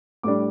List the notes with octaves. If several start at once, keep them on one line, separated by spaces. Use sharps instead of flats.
A2 G3 D4 D6